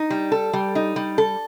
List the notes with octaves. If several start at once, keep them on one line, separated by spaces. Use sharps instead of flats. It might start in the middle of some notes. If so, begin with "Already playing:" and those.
Already playing: D#4
G3
A4
G3
D#4
G3
A4